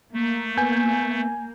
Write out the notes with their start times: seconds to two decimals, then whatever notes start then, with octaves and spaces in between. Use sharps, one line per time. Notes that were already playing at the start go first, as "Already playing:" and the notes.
0.14 A3 A#3
0.57 B3 G#5 G6